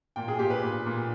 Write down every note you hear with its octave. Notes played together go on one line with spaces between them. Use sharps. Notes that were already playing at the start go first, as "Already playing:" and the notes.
A#2 G5
G#4
A#2 G4
B4
A#2
A#2